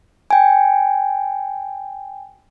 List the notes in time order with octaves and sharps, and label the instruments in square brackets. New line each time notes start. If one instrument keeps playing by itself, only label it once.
[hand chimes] G5 G#5